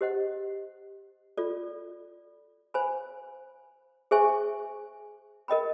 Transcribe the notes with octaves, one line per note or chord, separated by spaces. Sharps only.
G4 C5 D#5 F#5
F4 A4 D5
C5 F5 G#5 B5
G#4 C5 E5 G#5 C#6
A#4 D#5 G5 B5